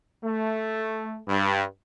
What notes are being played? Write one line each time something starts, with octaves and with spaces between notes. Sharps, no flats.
A3
G2